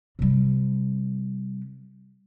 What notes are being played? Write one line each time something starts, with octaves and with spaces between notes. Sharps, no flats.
C3 G3